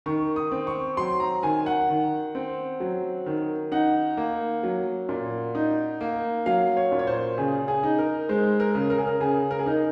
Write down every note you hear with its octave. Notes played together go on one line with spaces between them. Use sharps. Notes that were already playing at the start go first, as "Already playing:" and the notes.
D#3 C#6
D#6
C4
C#6
F#3 C6
A#5
D#3 G#5
F#5
D#3
C4
F#3
D#3
D#4 F#5
A#3
F#3
A#2
D#4
A#3
F#3 F5
C#5
A#2
C#5
C5
C#3 G#4
G#4
D#4
A#4
G#3 C5
A#4
C#3
A#4
G#4
A#4
C#3 G#4
A#4
G#4
D#4 A#4